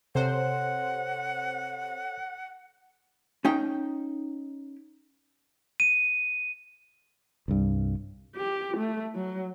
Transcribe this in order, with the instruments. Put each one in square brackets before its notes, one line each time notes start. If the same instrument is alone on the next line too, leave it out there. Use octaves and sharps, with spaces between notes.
[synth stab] C3 C5 [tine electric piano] A4 C#5 [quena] F#5
[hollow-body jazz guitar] C#4 D#4 G5
[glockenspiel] D#7
[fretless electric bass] C2 G2
[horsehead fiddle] G4
A3
F#3